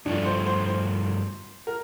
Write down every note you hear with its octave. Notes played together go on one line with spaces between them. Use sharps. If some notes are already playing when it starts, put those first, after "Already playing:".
G2 F3 A3 D4
C5
C5
C5
A#4